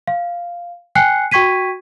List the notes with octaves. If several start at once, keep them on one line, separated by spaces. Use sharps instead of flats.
F5
G5 G#5 F#6 C7 C#7
F#4 G5 C#6 G#6 B6 D#7